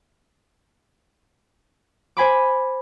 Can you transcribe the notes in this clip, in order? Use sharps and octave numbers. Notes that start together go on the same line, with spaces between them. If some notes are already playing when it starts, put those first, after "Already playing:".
C5 G#5 B5 D6